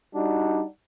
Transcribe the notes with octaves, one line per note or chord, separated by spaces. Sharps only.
G3 D4 D#4 F#4